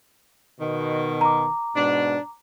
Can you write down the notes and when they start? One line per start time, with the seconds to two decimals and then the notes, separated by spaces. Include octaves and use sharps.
0.60 B2 D#3
1.21 A#5 D6
1.76 G#2 B2 D4